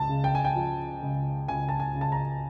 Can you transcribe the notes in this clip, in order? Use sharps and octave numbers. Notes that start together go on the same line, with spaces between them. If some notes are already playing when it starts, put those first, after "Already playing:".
Already playing: C#2 A5
C#3
G5
G#5
G5
F3
C#2
C#2 G#5
A5
G#5
C#3
A5
A#5